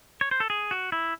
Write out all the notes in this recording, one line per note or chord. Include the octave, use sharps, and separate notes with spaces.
C#5
C5
A4
G#4
F#4
E4